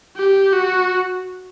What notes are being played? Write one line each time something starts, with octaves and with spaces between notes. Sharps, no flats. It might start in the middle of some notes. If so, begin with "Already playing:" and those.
G4
F#4